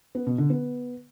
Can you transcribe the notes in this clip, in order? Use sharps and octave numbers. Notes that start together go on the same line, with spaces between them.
B3
B2
D3
B3